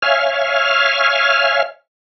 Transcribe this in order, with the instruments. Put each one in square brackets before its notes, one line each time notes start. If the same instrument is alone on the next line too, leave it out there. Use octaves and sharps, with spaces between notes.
[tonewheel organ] C#5 E5 F5 G#5 F6